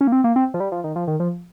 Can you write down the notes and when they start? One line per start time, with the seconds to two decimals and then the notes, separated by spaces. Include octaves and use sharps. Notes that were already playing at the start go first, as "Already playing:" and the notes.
0.01 C#4
0.07 A#3
0.12 C4
0.24 A#3
0.36 C4
0.54 F3
0.60 G3
0.72 F3
0.84 D#3
0.96 F3
1.07 D#3
1.20 F3